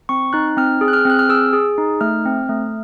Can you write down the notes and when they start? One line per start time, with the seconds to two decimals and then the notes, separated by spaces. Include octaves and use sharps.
0.09 C4 C#6
0.33 D#4 F#6
0.57 C4 F6
0.81 G#4
0.88 F#6
0.93 F6
1.05 C4 F#6
1.19 F6
1.29 G#4 E6
1.53 G#4
1.78 D#4
2.01 A3 F6
2.26 C4
2.49 A3